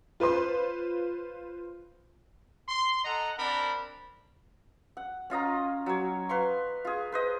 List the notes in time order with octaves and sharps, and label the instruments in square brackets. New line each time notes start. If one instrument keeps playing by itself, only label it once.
[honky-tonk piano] F4 B4 C5 C6
[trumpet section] C6
A4 D#5 F#5 A#5
C4 D4 A#4 D5 B5
[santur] F#5
C#4 F4 D#5 A#5
F#3 C#5
B4 F5 C6 C#6
F4 G#4
B4 C5 D#5